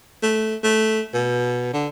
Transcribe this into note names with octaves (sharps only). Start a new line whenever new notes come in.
A3
A3
B2
D3